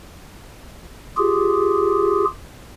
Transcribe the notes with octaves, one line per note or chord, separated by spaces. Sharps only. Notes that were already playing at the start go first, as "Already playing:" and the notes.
F4 G4 G#4